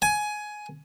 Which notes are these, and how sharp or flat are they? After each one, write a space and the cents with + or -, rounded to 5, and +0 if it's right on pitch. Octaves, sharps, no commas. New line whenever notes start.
G#5 +15